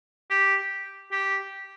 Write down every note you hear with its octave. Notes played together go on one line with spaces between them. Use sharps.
G4
G4